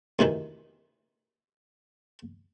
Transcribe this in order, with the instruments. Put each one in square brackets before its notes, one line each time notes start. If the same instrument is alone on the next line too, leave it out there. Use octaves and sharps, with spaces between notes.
[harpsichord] D2 C3 D#3 E3